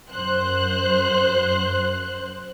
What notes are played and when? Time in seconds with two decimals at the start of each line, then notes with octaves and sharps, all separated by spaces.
0.10 F#2 C5 F#6